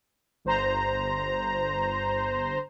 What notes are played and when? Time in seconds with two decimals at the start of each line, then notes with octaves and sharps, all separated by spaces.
0.45 G1 C5 A#5